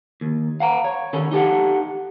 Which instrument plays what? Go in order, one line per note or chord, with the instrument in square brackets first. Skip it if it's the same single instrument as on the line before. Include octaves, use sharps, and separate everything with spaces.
[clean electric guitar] D#2
F5 F#5 A#5
C#5
D#3 C#4 A4
D#4 G4 A4 F#5